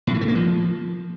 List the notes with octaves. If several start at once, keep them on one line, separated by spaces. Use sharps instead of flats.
A2
E3
A3
A#3
F3